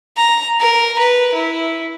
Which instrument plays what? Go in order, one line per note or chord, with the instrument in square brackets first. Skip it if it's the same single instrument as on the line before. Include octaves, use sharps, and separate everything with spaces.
[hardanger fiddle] A#5
A#4
B4
E4